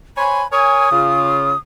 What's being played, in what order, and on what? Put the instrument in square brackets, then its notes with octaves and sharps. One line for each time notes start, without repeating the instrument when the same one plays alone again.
[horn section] C5 C#5 G#5 [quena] B5
[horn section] A#4 C#5 G#5 [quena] D#6
[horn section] C#3 F4